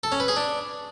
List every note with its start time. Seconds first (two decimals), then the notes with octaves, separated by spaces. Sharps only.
0.04 A4
0.12 C#4
0.20 B4
0.28 G#4
0.36 D4